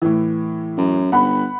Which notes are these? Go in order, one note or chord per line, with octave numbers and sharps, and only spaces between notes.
A2 E3
F#2
G1 F#5 B5